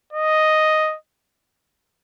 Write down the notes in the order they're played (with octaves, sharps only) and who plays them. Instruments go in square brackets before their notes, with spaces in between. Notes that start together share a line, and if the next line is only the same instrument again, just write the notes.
[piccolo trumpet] D#5